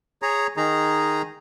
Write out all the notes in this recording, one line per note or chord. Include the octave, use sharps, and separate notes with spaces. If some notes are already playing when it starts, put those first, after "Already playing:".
G#4 C#5 A#5
D#3 D#4 G#4 A#5